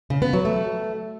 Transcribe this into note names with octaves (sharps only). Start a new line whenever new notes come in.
C#3
B3
F#3
A3